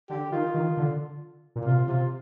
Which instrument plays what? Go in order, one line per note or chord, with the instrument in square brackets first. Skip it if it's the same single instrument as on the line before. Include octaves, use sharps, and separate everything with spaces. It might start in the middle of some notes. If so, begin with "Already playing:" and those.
[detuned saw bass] D3 [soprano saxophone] G4
[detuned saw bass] D#3 [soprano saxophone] F4
[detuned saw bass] D#3
D3
A#2
[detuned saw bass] C3 [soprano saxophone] F4
[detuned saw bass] C3 [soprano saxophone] F4